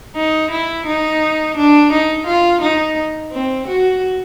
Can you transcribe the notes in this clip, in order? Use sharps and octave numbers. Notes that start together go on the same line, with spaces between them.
D#4
E4
D#4
D4
D#4
F4
D#4
C4
F#4